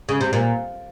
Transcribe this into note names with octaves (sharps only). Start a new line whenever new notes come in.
C#3
C3
A#2